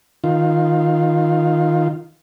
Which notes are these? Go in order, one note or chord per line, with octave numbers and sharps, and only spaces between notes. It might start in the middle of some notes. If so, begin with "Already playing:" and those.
D#3 F4